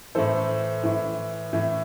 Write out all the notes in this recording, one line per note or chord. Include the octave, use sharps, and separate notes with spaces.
A2 E3 A4 C5
A2 E3
A2 E3